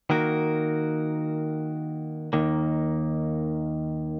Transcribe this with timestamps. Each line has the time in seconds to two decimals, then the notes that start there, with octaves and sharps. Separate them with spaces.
0.10 D#3 A#3 F#4 A#4
2.33 D#2 D#3 A#3